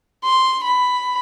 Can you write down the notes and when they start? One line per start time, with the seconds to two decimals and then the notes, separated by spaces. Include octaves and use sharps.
0.24 C6
0.64 B5